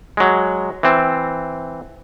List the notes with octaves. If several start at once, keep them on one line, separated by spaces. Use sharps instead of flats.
F#3 G#3
E3 C4